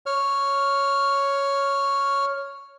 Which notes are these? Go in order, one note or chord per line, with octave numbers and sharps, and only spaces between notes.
C#5 F6